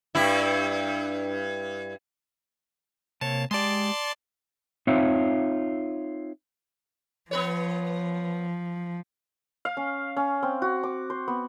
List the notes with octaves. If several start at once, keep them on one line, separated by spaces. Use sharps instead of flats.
G2 E4
C3 A#3 C#5 A5
G#3 G4 D5 A5 C6
C4 D#4 F4 C#5 E5
F3 B3 B4 C#5
F5
C#4
C#4
C4
F#4
D6
C5
B3